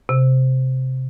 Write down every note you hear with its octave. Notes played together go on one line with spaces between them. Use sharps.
C3